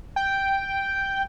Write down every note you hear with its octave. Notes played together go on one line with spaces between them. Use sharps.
G5